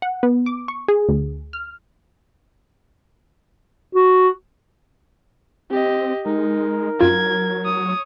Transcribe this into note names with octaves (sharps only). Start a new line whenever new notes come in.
F#5
B3
D6
C#6
G#4
D2
F6
F#4
C4 G4 D#5
G#3 D#4 A#4
F#2 F#3 F4 G#6
C#5 D#6